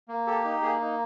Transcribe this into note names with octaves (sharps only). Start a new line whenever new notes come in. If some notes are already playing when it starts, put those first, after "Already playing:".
A#3
G4 A4
D#4
A#3 G#4
D#4